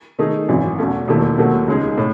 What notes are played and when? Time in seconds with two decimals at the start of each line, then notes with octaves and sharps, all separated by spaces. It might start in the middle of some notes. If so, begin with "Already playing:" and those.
0.19 D#3 A3 D#4 G#4
0.48 G#1 F#2 E3
0.78 E2 B2 A3 C#4
1.08 E1 D#2 D#3 A3 E4
1.38 D#2 D#3 F#3 A3
1.68 C#2 C#3 G#3 D#4 G#4
1.98 A2